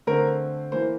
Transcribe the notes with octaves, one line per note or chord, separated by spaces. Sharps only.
D3 A3 C4 A#4
E3 A#3 C5